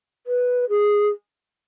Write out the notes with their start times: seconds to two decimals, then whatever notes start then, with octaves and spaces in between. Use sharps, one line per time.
0.26 B4
0.69 G#4